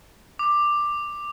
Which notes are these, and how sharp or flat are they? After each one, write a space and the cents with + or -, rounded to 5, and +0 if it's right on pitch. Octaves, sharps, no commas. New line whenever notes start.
D6 +10